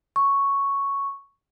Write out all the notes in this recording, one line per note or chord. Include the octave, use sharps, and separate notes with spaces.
C#6